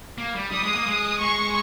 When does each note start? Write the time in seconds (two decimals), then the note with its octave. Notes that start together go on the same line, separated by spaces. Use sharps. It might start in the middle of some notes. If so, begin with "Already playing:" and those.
0.18 A#3
0.35 G3
0.51 G3 D#6
0.63 G#3
0.75 A#3
0.86 G#3
1.21 G#3 C#6